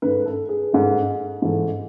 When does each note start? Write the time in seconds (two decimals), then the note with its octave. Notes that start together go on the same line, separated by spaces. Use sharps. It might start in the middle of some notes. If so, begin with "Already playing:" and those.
0.02 G#2 D#3 A3 B4
0.25 A4
0.49 G#4
0.72 G#2 D#3 A3
1.42 G#2 E3 A3